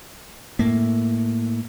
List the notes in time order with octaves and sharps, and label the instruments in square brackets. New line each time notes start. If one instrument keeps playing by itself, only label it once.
[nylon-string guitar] A2 [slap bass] A#3